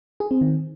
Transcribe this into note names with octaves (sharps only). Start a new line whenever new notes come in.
G#4
C4
D#3